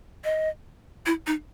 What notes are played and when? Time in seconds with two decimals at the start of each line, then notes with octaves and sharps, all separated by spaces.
0.24 D#5
1.06 E4
1.27 D#4